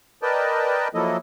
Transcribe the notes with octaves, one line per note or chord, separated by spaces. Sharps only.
A#4 B4 D5 D#5 G5 A5
F3 F#3 A#3 E4 A4 D#5